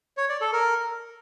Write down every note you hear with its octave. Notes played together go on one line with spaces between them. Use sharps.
C#5
D5
A4
A#4